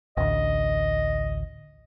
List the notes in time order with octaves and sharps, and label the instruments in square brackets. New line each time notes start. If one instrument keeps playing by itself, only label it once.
[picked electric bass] A1 D2 [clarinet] D#5